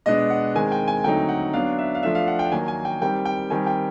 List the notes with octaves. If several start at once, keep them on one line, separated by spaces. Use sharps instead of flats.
B2 G#3 B3 D4 D#5
F#5
D#3 G#3 C4 G#5
G5
G#5
D3 F#3 A3 C4 D#4 G5
F#5
F#3 B3 D4 F5
E5
F5
F3 A3 D4 E5
F5
F#5
G5
D#3 F#3 A#3 G#5
G#5
G5
D#3 G3 C4 G5
G5
D#3 G3 C4 G#5
G5